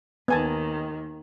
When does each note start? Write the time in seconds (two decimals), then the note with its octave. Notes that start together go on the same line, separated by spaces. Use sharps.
0.28 D#2 D#3 B3 G#5 A5